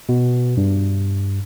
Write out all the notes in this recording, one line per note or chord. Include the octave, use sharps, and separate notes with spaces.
B2
G2